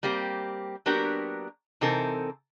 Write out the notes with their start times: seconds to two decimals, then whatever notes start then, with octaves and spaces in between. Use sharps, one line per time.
0.03 G3 A#3 C4 G4
0.86 F#3 A#3 B3 D4 G4 A#4
1.81 C3 E3 C4 D#4 A4 A#4